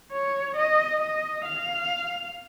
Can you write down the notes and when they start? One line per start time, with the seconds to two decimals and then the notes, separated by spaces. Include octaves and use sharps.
0.12 C#5
0.57 D#5
1.01 D#5
1.45 F5